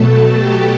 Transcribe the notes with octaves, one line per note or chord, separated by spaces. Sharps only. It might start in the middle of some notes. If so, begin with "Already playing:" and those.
Already playing: B2 F#3 A3 A4
G4